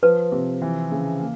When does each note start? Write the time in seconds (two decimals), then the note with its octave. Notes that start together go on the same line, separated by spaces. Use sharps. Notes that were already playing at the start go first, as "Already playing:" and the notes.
0.02 F3 B4
0.32 C3
0.62 E3
0.92 C#3
1.20 A#3